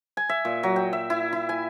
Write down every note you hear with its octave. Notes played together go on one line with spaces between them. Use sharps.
G#5
E5
A#2
F#3
G5
E5
E4
E4
G#5